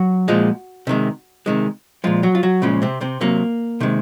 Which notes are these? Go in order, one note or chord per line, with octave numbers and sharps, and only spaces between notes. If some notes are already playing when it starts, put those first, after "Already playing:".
Already playing: F#3 F#4
A#2 F3 G#3
C3 D#3 G#3
C3 D#3 G#3
A#2 F3 G#3 F4
F#3 F#4
F4
F#3 F#4
A#2 C#3 F3 G#3 C#4
C3 C4
C3 C4
C3 F#3 A#3
C3 D#3 G#3